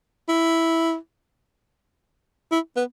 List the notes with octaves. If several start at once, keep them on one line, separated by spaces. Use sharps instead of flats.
E4
E4
B3